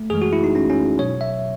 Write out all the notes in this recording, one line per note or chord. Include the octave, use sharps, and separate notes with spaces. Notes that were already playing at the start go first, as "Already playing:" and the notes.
Already playing: A3
F#2 E3 G#3 G#4
F#4
E4
D#4
C#4
C#4
B2 F#3 C#5
E5